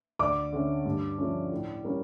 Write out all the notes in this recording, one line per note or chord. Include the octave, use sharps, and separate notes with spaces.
D2 D5 D6
D3 A3 C#4
G2
F3 A3 C#4
A2
G3 A#3 C#4